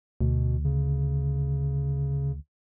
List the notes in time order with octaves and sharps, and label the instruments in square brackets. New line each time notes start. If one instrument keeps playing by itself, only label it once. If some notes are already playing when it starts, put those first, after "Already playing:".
[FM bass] D2 [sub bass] B2
[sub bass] C#3